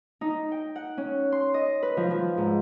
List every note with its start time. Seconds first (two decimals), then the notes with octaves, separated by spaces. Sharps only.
0.21 D#4
0.52 G5
0.76 F#5
0.97 C#4
1.32 C6
1.54 D#5
1.83 B4
1.97 F3
2.11 F3
2.38 G#2